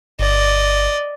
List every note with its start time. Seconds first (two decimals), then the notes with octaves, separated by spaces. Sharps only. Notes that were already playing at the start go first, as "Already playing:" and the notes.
0.19 G1 D5 D#5